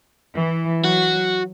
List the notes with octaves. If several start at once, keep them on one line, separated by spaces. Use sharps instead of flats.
E3
F#3 F#4